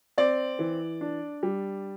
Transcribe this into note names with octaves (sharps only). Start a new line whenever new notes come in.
C4 D5
E3
D4
G3